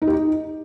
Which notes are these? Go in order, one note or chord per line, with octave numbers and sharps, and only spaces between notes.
D#4
G4
D#4